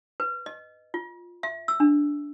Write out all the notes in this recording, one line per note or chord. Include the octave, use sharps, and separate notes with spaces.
B4
D#5
F4
E5
E6
D4